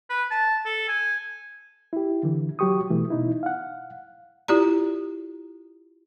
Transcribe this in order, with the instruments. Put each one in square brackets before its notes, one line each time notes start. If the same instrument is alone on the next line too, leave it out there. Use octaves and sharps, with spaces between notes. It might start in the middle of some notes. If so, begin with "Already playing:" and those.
[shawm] B4
A5
A4
G#5
[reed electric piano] E4 G4
D3 E3
F#3 F#4 G4 C#6 D#6
B2 E3 A3
B2 D#4 E4
F5 F#5
[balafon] E4 F4 G4 D5 A#5